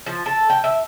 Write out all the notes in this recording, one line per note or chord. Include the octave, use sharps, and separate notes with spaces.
F3
A4
G5
E5